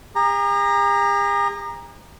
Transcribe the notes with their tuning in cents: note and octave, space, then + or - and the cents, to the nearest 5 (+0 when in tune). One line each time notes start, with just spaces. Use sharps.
G#4 -45 A#5 +5